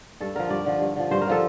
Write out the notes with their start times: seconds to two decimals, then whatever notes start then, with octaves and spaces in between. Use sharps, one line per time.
0.20 G2 A4
0.35 D3 F3 A#4
0.50 G2 D5
0.66 D3 F3
0.81 G2
0.96 D3 F3
1.11 G2 C5
1.21 A#4
1.27 D3 F3 A4